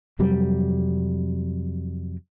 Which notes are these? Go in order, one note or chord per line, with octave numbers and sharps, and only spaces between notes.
F2 C3 F#3 G3